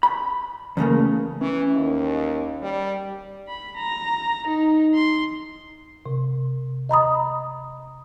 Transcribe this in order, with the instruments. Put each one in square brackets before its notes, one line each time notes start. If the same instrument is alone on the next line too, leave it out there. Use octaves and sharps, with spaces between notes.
[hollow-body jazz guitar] B5
E2 C#3 A3 A#3
[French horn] E3 [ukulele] C#4
[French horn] D#2
G3
[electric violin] B5
A#5
D#4
C6
[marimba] C3
D#5 A#5 B5 D#6